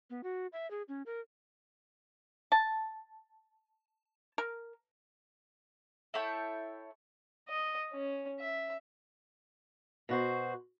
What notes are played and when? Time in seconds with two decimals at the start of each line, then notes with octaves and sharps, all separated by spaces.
0.10 B3
0.23 F#4
0.53 E5
0.71 G#4
0.88 C#4
1.06 A#4
2.52 A5
4.38 A#4
6.14 E4 A4 C#5 G5
7.49 D#5
7.93 C#4
8.40 E5
10.09 B2 F#4 C5